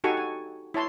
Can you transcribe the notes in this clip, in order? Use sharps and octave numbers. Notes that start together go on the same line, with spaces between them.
D#4 F#4 G4 A4 G#5 C#6
G#5
E4 C#5 A5 C6